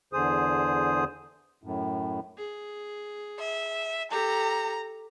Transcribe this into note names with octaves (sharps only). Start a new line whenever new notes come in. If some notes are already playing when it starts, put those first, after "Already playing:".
E2 D3 G#4 C5 D#6
F#2 A2
G#4
E5
G4 A4 A#5